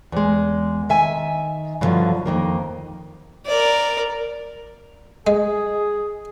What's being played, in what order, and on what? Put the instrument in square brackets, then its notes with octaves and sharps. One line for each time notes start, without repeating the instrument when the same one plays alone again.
[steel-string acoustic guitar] E2 G#3
D#3 E5 G#5
G2 B2 D3 D#3 F3 F#3
F2 D#3 A#3
[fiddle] A#4 D5
[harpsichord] G#3 [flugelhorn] G#4